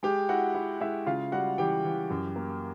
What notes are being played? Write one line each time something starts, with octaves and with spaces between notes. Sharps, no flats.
G#3 G4 G5
E4 F#4 F#5
E4
G#3 E4 E5
C#3 F4 F5
G3 F#4 F#5
E3 G4 G5
E3
F#2
A#3